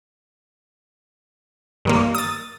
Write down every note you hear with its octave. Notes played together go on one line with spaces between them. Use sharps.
G2 D#3 A#3
D#6 A6